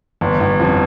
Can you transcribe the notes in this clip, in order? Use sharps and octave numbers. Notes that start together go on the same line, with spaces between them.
G1
G1
F2